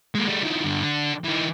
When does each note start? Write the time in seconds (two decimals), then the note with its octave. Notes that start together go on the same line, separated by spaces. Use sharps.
0.15 G#3 A#3
0.27 G3 A3
0.43 D#3 F3
0.64 G2 D3
0.83 D3
1.24 E3 D#4